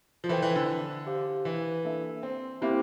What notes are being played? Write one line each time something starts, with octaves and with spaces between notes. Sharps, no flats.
F3
E3 E4 A4 C5 G5
E3
D3
G4 C5 F5
E3
A#3 D4 A4 E5
C4
A#3 C4 E4 G4 C5 E5